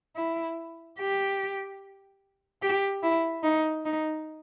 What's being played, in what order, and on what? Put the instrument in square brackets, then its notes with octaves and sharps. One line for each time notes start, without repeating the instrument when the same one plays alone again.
[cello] E4
G4
G4
E4
D#4
D#4